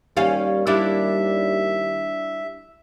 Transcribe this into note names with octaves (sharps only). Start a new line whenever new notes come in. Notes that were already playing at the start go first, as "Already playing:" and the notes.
D#2 G3 C#4 F5
G3 D4 E4 E5